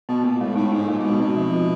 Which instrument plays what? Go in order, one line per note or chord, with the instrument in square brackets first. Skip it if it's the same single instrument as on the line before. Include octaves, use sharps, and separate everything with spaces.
[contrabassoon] B2 [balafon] B3
[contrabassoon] A#2 [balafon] B3
[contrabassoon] A2 [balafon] G#3
[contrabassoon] A2 [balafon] D#4
[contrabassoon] G#2 [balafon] D#4
[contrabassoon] A#2 [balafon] G#3
[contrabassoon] A#2
[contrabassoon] B2 [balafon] D#4
[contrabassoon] B2 [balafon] C4
[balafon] F3
F4